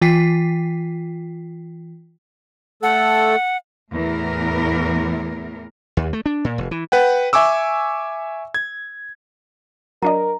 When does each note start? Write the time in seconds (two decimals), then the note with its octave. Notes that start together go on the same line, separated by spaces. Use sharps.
0.02 E3 F4 G5 B6 C7
2.83 A3 A4 F#5
3.92 E2 A2 E3 A#4
5.97 D#2
6.13 A3
6.26 D4
6.45 A#2
6.58 F1
6.71 E3
6.92 B4 F#5 G5
7.33 E5 G#5 C#6 D6 E6
8.54 G#6
10.02 F#3 D4 A#4 D#5 A#5